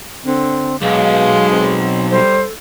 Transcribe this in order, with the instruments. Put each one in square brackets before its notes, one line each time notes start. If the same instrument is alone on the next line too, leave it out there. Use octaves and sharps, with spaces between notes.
[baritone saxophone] D3 [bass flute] C4
[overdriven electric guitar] B1 [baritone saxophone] G#3 [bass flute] F5
[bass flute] C4
[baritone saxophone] G3 [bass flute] A4 [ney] C5